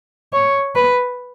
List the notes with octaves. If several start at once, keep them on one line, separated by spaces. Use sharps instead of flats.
C#5
B4